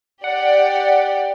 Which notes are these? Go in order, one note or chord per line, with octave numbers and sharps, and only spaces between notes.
G4 D5 F#5